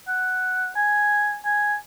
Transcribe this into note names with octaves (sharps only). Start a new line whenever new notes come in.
F#5
G#5
G#5